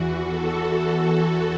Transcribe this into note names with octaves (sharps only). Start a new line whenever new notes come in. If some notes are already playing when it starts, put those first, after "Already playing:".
Already playing: E2 E3 F#4
A4
F#4
A4